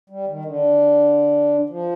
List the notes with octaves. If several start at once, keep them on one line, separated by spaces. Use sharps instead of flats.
G3
D#3
D3
F3